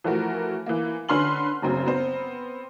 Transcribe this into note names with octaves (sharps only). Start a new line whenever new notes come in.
E3 F3 A3 F#4 A#4
E3 A#3
D3 C#4 B4 C6 F6 F#7
F#1 F#2 C#3 C4
B3 C4 C5